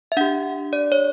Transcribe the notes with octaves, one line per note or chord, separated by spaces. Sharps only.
E5
D4 G4 F#5
D5
C#5